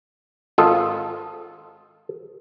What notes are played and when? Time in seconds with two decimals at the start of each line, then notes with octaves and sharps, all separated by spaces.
0.58 G#1 F4 A4 D#5